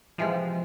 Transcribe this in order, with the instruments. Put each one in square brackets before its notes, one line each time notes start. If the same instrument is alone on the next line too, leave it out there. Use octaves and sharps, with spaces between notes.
[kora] C3 E3 G#3 [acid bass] F3